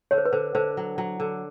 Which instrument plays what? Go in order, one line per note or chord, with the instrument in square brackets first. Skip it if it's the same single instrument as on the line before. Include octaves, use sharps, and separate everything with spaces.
[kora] D3 [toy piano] C#5
[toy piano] C5
B4
[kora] D3 [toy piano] C5
[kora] D3 [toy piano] C5
[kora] F#3
F#3
D3